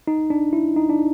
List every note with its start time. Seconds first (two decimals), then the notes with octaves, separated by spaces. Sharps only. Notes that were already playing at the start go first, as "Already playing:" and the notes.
0.07 D#4
0.30 D4
0.53 E4
0.76 D#4
0.89 D4